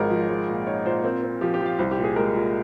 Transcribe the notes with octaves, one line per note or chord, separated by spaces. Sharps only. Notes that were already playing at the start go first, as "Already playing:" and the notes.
Already playing: G#1 F3 G#3 A#4 C#5
F3
G#3
A#2
D#4 C#5
A#2 C5
C4 A#4
C4
F3 G4
G4
F3
F5
C2 C5
G4
A#2
G#4
G#3 A#4
A#2